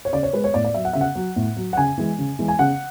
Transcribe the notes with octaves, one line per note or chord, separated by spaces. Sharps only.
C#5
C#3 D5
C#5
G#3 B4
C#5
A2 D5
D5
F#3 E5
F#5
C#3 E5
F#5
F#3
A2
F#3
F#5
C#3 G#5
E3 G#3
C#3
E3 G#3
G#5
C#3 F#5